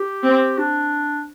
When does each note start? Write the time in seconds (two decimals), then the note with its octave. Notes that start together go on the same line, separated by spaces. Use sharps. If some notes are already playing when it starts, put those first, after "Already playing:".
Already playing: G4
0.23 C4
0.58 D4